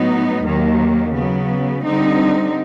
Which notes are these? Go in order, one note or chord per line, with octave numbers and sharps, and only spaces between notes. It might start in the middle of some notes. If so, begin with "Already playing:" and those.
Already playing: A2 F#3 B3 D#4
D#2 D#3 F#3 A#3
C#3 F#3 B3
D3 G3 C4 D#4